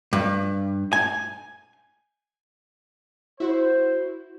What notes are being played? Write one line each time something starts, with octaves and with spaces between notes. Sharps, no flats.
G2
G#5
E4 F#4 C5